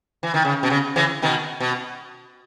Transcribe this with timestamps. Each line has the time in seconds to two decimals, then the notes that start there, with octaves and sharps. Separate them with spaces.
0.23 E3
0.34 D#3
0.45 C#3
0.63 B2
0.70 C#3
0.96 C#3 E3
1.22 B2 D#3
1.60 B2